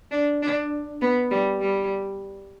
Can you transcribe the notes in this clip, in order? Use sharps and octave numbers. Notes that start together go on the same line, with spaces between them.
D4
D4
B3
G3
G3